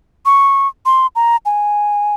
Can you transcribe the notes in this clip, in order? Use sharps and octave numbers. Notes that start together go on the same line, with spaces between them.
C#6
C6
A#5
G#5